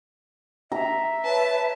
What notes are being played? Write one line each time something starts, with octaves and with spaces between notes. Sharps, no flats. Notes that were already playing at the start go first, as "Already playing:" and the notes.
E5 A#5
B4 C#5 A5